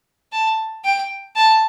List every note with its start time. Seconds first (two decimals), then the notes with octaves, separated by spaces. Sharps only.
0.32 A5
0.84 G5
1.36 A5